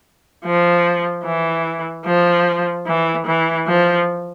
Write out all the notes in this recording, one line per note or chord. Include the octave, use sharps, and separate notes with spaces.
F3
E3
F3
E3
E3
F3